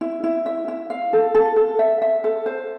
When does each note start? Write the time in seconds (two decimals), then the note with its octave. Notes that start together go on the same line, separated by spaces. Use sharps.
0.01 E4
0.24 E4
0.46 E5
0.68 E4
0.90 F5
1.13 A4
1.35 A4
1.56 A4
1.79 E5
2.02 E5
2.24 A4
2.46 C5